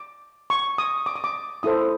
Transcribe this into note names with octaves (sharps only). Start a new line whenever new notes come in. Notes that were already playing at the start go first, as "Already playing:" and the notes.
Already playing: D6
C#6
D#6
D6
D#6
D6
E4 A4 C5 D#6